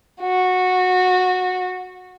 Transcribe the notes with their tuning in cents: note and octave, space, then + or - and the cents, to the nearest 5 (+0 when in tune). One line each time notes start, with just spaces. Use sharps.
F#4 -15